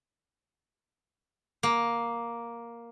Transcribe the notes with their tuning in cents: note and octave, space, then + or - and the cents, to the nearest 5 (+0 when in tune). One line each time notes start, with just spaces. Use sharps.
A#3 +5